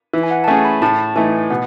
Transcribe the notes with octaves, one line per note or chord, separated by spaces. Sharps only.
E3 E5
G#5
F#5
A5
A3 C#4 G#4 G#5
B5
A2 A5
E3 A3 D#4 G#5
B2 F#5